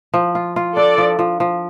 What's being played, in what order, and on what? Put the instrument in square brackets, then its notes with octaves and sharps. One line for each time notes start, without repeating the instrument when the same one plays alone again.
[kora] F3
F4
F4
[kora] D4 [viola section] A4 D5
[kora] F3
F3
F3